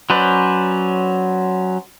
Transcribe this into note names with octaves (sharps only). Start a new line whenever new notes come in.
F#3 C#4 B4 C5 D5